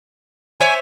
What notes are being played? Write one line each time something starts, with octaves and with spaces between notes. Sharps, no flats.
C5 C#5 E5 G#5